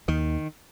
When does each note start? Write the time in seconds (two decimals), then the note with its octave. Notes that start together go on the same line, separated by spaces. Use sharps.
0.08 D#2 D#3